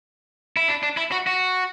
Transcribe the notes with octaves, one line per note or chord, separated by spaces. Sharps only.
E4
D4
D4
E4
F#4
F#4